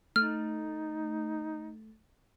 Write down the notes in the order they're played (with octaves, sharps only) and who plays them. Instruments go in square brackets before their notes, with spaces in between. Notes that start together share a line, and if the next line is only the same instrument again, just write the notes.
[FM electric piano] A3 [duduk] D#4 [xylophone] F6